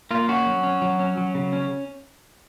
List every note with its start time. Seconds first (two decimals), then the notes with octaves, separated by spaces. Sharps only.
0.11 A#3 F4
0.28 C#4 F#4
0.47 F#3
0.63 C#4
0.82 F#3
0.99 C#4
1.17 F#3
1.35 C#3
1.53 C#4